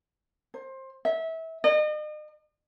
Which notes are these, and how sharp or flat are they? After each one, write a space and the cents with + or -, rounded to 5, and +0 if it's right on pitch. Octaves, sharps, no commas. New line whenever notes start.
C5 +20
E5 -25
D#5 -40